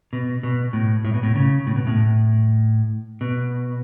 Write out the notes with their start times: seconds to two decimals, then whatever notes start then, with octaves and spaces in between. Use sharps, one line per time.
0.13 B2
0.43 B2
0.73 A2
1.05 A2
1.14 B2
1.23 A2
1.36 C#3
1.67 A2
1.76 B2
1.87 A2
3.21 B2